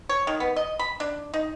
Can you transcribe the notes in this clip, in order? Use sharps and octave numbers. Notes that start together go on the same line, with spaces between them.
C#5
D#3
B3
D#5
B5
D4
D#4